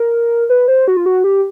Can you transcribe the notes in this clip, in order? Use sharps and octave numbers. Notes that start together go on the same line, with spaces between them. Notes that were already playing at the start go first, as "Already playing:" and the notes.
Already playing: A#4
B4
C5
F#4
F4
F#4
G4